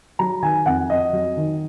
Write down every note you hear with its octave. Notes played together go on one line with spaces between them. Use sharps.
F#3 A#5
D#3 G#5
F2 F#5
F2 D#5
F#3
D#3